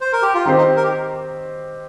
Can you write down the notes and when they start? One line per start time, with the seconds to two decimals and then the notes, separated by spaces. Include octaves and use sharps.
0.01 C5
0.13 A#4
0.23 G4
0.34 F4
0.45 D#3 C4 D#4 G4 C5 D#5
0.58 D#4
0.77 A#4
0.84 G4